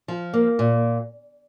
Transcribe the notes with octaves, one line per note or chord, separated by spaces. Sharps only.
F3
A#3
A#2